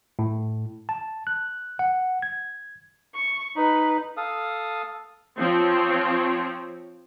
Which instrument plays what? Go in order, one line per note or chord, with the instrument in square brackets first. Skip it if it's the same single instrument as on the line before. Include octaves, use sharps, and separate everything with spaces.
[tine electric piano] A2
A5
F#6
F#5
G#6
[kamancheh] C#6
[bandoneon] D#4 [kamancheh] B4
[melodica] A4 F5 D#6
[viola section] F3 C4 C#5